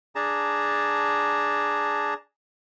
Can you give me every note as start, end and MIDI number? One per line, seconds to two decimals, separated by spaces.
0.15 2.14 62
0.15 2.14 68
0.15 2.14 81
0.15 2.14 82